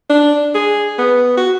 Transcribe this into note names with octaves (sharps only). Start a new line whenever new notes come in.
D4
G#4
B3
F#4